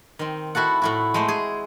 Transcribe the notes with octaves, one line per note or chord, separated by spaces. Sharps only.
D#3 C4
E4 F#4 A4 F#5
A2 E4 F#4
G#3 A3 C5
G#4